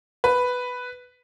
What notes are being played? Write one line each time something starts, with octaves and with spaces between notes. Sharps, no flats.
B4